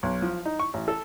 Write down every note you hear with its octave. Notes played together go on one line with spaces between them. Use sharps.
B1
F3
D#4
C#6
A1
A4